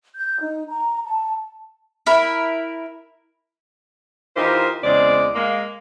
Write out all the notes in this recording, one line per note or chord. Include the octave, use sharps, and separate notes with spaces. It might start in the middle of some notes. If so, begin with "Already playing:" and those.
G6
D#4
A#5
A5
E4 A#4 B5
E3 D#4 F4 G4 A#4 C5
E2 C#3 G#3 C4 D5
G#3 A#3